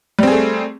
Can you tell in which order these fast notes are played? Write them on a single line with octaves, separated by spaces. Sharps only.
G3 C4 G#4 A3